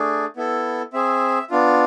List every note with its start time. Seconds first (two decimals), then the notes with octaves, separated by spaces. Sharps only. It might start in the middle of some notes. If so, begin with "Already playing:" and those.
Already playing: A3 D4 G#4
0.37 B3 E4 A4
0.93 C4 G#4 E5
1.50 B3 D4 F4